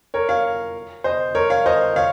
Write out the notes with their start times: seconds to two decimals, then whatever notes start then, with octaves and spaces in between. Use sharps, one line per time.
0.14 A#4 C#5
0.29 C#5 F5
1.04 C5 D#5
1.35 A#4 C#5
1.50 C#5 F5
1.66 C5 D#5
1.96 C#5 F5